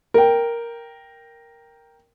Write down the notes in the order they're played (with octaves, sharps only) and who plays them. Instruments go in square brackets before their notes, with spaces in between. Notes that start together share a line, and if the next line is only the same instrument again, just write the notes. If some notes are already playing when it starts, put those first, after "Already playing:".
[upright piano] A#4 G5